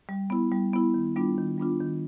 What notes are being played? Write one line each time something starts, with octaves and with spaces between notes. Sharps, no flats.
G3
B3 E4
G3
B3 E4
D#3
G3 B3 D4 F4
D#3
G3 B3 D4 F4
D#3